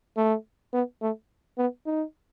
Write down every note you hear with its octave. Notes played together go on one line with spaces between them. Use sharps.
A3
B3
A3
B3
D#4